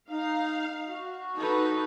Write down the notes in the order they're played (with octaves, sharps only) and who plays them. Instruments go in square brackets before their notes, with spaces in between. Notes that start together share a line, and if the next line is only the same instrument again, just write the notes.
[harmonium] D#4 [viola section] F5
[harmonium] F#4
[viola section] D#4 [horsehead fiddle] A4 B4